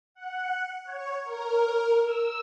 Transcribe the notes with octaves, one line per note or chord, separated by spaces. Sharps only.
F#5
C#5
A#4
E6